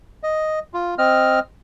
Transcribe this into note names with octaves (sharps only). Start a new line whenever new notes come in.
D#5
F4
C4 D#5 F6